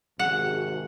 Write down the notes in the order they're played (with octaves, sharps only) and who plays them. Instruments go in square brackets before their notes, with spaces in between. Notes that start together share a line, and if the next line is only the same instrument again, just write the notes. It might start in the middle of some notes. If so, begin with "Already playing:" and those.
[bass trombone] G#1 [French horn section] C3 F#4 G#4 [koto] F#5